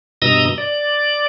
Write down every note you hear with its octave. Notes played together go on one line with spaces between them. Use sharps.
G2 B2 D#5 A#5 D#6 E6
D5